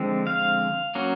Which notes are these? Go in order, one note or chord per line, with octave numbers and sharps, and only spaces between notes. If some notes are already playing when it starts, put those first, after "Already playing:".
Already playing: D3 F3 G#3 C4
F5
F#3 A#3 C#4